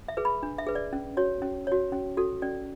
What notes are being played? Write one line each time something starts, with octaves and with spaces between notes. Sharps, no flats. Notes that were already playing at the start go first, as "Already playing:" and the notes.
E5
G#4 B4
B5
D4
E5
G#4 B4
D5
C#4
F#4 C#5
C#4
F#4 C#5
C#4
F#4 A4
C#4 D5